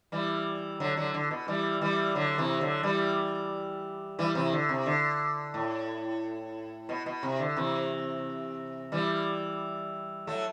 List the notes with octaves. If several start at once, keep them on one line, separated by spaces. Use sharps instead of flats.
E3 G3
D3 F#3
D3 F#3
D3
B2
E3 G3
E3 G3
D3 F#3
C3 E3
D3 F#3
E3 G3
E3 G3
C3 E3
D3
C3
D3
A2
B2
B2
C3
D3
C3 E3
E3 G3
F#3 A3